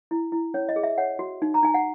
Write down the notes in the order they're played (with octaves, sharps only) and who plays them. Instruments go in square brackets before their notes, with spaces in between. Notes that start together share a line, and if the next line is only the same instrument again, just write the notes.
[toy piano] E4
E4
C#4 C#5
D#5
G#4
E5
C#5 F#5
F#4
D#4
A#5
D#4 G#5
F#5